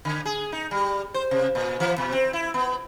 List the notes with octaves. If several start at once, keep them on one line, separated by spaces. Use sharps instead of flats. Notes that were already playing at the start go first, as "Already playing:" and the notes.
D3
G#4
D#4
G3
C5
C3
A#2
E3
B2
C4
E4
B3